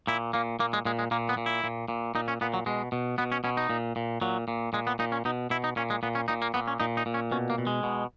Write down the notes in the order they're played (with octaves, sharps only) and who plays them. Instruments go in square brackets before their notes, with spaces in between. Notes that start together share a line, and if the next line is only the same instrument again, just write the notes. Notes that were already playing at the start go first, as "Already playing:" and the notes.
[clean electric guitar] A#2 E4
A#2 A#3
A#2 A#3
G#3
A#2 G#3
G#3
A#2 A#3
B3
A#2
E4
A#2
A#2
A#2 D#4
C#4
A#2 B3
F#3
B2 G#3
B2
B2 B3
C#4
B2 C#4
D#4
A#2
A#2
A#2 F#3
A#2
A#2 G#3
B3
A#2 D#4
C#4
B2 D#4
B2 E4
D#4
A#2 C#4
G#3
A#2 B3
C#4
A#2 D#4
A#3
A#2 B3
C#4
A#2 D#4
D#4
A#2
C#4
B2 C#4
A#3
B2
G#3
B2